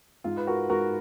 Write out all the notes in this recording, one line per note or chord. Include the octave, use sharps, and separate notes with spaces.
G#2 F4
B4
F#4 A#4
G#2 F#4 A#4